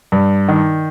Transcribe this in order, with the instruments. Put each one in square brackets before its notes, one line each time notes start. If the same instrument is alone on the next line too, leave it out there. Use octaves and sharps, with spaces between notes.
[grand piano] G2
D#3